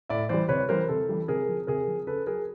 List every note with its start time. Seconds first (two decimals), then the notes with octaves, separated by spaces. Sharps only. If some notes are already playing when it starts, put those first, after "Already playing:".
0.09 A2 D5 E5
0.29 E3 G3 C5 D5
0.49 C3 B4 C#5
0.69 E3 G3 A#4 C5
0.89 C3 A4
1.09 E3 G3
1.28 C3 G#4 A#4
1.49 F3
1.67 C3 G#4 A#4
1.88 F3
2.07 C#3 A4 B4
2.27 F#3 G#4 A#4